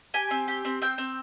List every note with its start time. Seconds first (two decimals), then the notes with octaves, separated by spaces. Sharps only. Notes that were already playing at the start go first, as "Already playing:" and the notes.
0.14 G4 G#5
0.31 C4
0.48 G4
0.65 C4
0.82 C4 G5
0.98 C4